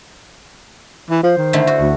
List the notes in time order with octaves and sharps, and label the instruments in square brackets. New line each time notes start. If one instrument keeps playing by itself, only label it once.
[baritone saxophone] E3
[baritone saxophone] F3 [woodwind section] C5
[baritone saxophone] D#3
[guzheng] D3 A3 E4
F#4
[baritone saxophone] D2